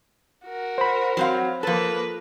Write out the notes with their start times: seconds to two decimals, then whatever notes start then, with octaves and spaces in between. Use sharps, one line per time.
0.46 F#4 A#4
0.78 C5 B5
1.17 F#3 C4 F5
1.63 F3 A#3 A4 B4